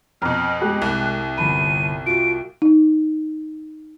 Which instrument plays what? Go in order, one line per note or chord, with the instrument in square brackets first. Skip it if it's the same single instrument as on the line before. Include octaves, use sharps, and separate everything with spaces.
[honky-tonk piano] F2 B2 [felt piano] A#5 [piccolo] F6
[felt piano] G#3 G4 [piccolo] F#6
[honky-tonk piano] C2
[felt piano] G1 A5 B5 [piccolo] D#7
[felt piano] F4 F#4 [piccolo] D7
[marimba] D#4